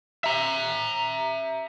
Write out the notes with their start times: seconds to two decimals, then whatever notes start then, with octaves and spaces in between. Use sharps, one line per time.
0.24 E5 A#5